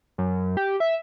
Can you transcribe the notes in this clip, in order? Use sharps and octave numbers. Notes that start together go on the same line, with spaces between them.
F#2
G4
E5